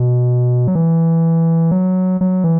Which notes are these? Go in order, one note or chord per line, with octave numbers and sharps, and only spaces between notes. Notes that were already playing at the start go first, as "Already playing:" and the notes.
Already playing: B2
F#3
E3
F#3
F#3
E3